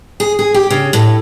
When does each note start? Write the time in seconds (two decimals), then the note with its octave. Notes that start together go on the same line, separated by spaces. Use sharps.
0.20 G#4
0.39 G#4
0.54 G4
0.70 C#3
0.93 A2